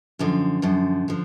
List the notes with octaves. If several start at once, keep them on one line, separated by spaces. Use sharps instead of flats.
F#2 D3 F3
F#2 D3 F3
D3 F3